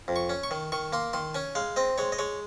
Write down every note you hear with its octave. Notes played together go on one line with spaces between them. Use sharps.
F2
C#6
C#4
C#6
D#3
D#3 C#6
A#3 C6
D#3 C6
C#4 G#5
G#3 F5
C4 D#5
G#3 C#5
D#5
G#3 C#5